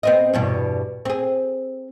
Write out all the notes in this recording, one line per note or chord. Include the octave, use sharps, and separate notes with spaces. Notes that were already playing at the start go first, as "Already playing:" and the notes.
B3 C4 D#5
E2 G2 B2
C4 G#4